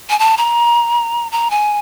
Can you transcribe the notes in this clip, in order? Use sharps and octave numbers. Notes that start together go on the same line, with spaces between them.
G#5
A5
A#5
A#5
G#5